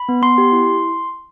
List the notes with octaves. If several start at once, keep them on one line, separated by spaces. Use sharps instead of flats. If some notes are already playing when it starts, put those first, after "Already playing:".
Already playing: B5
B3
B3 C6
G4
E4